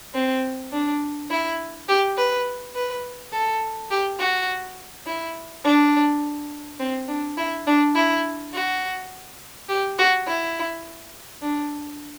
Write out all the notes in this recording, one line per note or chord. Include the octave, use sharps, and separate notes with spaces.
C4
D4
E4
G4
B4
B4
A4
G4
F#4
E4
D4
C4
D4
E4
D4
E4
F#4
G4
F#4
E4
D4